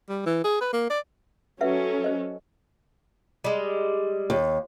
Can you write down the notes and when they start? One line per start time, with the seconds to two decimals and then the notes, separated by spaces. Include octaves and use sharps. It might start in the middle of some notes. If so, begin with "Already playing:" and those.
0.09 G3
0.26 E3
0.44 G#4
0.61 B4
0.73 A#3
0.90 D5
1.61 F#3 C#4 A4 B4 E5 F#5
2.04 C5 D#5
3.44 G3 G#3
4.30 D#2